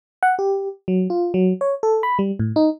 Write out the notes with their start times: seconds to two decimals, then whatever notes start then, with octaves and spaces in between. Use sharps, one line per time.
0.23 F#5
0.39 G4
0.88 F#3
1.10 F4
1.34 F#3
1.61 C#5
1.83 A4
2.03 B5
2.19 G3
2.39 A2
2.56 D#4